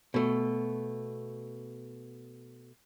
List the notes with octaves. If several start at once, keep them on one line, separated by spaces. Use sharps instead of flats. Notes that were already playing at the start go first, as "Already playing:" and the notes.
B2 A3